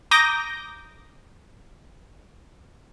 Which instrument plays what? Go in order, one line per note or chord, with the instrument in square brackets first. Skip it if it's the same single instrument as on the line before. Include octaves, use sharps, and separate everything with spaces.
[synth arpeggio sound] A#5 D6 D#6 G6 A#6